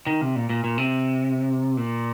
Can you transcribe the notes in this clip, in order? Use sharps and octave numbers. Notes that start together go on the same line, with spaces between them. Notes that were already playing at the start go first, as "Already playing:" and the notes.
D#3
C3
A#2
A#2
A#2
C3
A#2